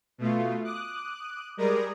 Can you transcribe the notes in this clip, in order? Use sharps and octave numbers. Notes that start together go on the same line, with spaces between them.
B2 A3 F4
D6 D#6 F#6
G3 G#3 A#4 D5 A#5 D#6